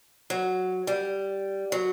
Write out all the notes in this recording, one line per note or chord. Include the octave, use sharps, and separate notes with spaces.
F#3
G3
F#3